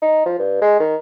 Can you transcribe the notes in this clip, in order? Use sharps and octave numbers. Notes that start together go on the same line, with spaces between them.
D#4
F3
G2
G#3
D#3